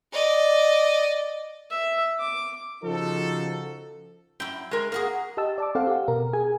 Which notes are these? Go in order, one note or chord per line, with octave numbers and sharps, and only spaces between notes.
D5 D#5
E5
D6
C#3 F3 D#4 F#4 A4
F#2 E4 G5
G#3 A#4
A#3 F#4 G#4 A#4
G4 D#5 A5 E6
D5 A5 D6
C4 A4 C5 F5 F#5
G4 F5
B2 A#4
G#4 G#5